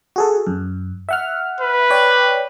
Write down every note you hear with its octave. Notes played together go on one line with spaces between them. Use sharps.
F#4 G#4 A4
F#2
E5 F#5 F6
B4
C#5 D5 G5